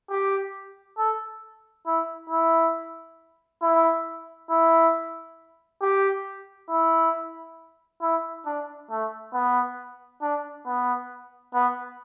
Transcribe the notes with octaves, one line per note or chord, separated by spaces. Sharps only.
G4
A4
E4
E4
E4
E4
G4
E4
E4
D4
A3
B3
D4
B3
B3